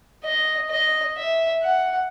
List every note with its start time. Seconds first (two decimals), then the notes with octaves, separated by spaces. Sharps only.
0.24 D#5
0.70 D#5
1.17 E5
1.63 F#5